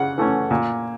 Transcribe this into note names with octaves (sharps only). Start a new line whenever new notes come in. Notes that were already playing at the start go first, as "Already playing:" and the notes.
Already playing: C#3 F#5
E3 A3 C#4
A#2